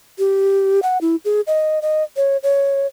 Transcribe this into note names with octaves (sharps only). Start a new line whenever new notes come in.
G4
F#5
E4
G#4
D#5
D#5
C#5
C#5